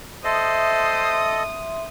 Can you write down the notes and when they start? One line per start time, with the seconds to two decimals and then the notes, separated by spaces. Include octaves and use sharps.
0.24 A4 C5 D#5 E5 C6 D#6